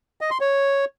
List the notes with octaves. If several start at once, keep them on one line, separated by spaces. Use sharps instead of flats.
D#5
C6
C#5